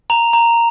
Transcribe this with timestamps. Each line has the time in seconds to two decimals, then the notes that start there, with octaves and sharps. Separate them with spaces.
0.10 A#5 F7
0.33 A#5